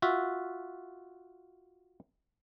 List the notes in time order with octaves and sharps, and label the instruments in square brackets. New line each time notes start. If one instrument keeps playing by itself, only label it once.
[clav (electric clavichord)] F4 F#4 E5